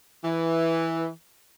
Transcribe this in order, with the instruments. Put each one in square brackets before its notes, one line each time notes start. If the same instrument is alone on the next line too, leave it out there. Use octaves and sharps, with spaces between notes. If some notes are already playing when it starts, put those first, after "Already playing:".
[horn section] E3